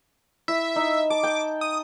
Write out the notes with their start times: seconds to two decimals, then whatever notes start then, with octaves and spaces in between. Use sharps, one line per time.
0.48 E4 E5
0.76 D#4
1.10 A5 D6
1.23 G5
1.61 D#6